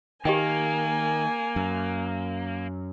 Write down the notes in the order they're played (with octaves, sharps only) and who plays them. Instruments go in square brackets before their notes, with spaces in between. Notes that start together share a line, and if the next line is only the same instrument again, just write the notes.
[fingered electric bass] D#3 [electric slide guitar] A#3 [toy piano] G4 D#5 G5 [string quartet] G#5
[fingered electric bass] F#2